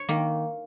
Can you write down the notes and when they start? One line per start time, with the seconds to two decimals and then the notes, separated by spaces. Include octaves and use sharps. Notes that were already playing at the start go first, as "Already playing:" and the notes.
Already playing: C#5
0.08 D#3 A#3